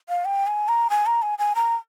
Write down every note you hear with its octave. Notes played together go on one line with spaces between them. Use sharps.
F5
G5
G#5
A#5
G#5
A#5
G#5
G#5
A#5